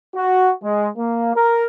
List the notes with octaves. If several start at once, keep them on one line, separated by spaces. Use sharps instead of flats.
F#4
G#3
A#3
A#4